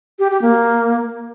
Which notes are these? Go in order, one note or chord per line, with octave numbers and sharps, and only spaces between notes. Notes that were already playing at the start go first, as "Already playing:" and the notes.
G4
G4
A#3